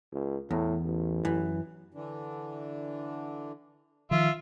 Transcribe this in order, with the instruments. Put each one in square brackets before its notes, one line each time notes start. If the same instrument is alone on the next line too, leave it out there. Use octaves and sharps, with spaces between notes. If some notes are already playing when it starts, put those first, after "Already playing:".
[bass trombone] C#2
[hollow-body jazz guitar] E2 [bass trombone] A2
[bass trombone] A1
[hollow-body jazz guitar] F#2 E3
[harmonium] D3 E3 D4
[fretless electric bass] D#3 F3 [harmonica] F4 E5